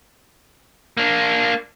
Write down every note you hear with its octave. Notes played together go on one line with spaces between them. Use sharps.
A#3 D4